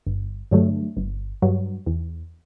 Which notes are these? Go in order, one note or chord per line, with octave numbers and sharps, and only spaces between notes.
G1
G2 D3 F#3 A3
G1
G2 F#3
E2